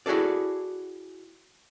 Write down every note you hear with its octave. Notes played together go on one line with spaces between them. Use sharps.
E4 F#4 G#4 A4 D5